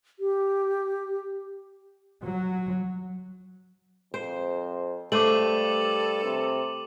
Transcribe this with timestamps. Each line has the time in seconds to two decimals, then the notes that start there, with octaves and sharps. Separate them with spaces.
0.19 G4
2.23 F#3
4.14 F2 C5
5.12 G2 A3 A4 C5 D6 D#7 F#7
6.24 C3